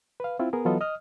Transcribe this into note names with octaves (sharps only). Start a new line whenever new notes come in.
B4 F5
C4 E4 F4
B3 G#4 A#4
E3 F#3 B3 F4 A4 D#5
D#5 D#6 F6